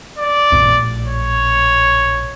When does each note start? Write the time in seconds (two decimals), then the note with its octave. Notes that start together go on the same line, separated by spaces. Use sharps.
0.18 D5
0.52 A#1 A2
1.07 C#5